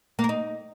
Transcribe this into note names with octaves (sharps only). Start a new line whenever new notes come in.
A#3
A#4
D#4